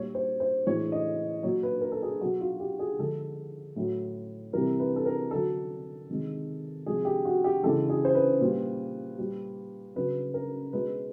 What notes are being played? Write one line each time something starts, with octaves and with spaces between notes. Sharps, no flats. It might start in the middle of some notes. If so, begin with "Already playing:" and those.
Already playing: A#2 G3 C#5
C5
C5
A2 E3 G#3 C#5
D#5
A#2 F#3 C#5
B4
A#4
A4
G#4
B2 F#3 F#4
F4
G4
G#4
D3 F3 G#3 A4
A2 F#3
C3 E3 G3 A#4
B4
A4
A#4
D3 F#3 A4
C3 D#3 G#3
C3 F3 G#3 G#4
G4
F#4
G4
C#3 E3 G#3 A4
G#4
C5
B4
A#2 G3
A#2 G3
C#3 F#3 B4
A#4
B2 G#3 B4